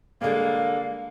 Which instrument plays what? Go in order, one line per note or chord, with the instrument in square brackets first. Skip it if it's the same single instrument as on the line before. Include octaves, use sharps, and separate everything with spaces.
[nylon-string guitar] D3 G3 [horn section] G#3 A#3 [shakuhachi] F5